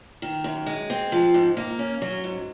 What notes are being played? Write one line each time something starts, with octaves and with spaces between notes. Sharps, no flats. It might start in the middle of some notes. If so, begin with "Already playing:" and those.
D#3
F#2
G#3
C4
F3
G#2
A#3
C#4
F#3
G#2